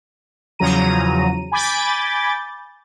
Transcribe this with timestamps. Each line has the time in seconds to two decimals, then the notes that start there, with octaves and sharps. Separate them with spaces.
0.59 E2 C#3 F3 F#3 A#5 D#7
1.52 G#5 B5 D6 G6 A6